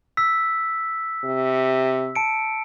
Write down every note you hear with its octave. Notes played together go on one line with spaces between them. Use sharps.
E6 B6
C3
A5 C#7 D7